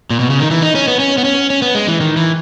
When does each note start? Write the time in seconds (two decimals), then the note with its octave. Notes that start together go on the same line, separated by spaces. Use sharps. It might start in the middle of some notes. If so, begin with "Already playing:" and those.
0.10 A#2
0.20 B2
0.30 C#3
0.40 D#3
0.51 E3
0.62 D#4
0.75 C#4
0.88 B3
0.99 C#4
1.18 B3
1.24 C#4
1.50 C#4
1.62 B3
1.75 G#3
1.88 E3
2.01 D#3
2.17 E3